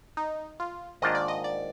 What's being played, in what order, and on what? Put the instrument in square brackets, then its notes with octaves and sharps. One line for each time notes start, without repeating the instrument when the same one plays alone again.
[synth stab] D#4
F4
[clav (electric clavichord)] G#2 D#3 A#3 D4 F4 [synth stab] D#5
[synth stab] D5
D#5
D5